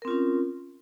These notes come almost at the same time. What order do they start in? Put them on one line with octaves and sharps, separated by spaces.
A#4 C4 F4 C#4